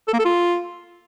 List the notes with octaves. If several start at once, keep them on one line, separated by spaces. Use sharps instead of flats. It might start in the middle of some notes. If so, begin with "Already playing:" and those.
A4
A#3
A4
F4